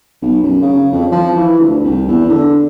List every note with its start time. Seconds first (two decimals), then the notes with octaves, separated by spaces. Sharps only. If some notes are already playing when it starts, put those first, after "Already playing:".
0.22 B1
0.43 F#2
0.62 C#3
0.92 F2
1.12 F3
1.36 E3
1.60 D2
1.84 C2
2.08 E2
2.29 D3